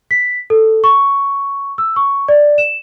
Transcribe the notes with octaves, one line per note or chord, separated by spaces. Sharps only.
B6
A4
C#6
E6
C#6
D5
E7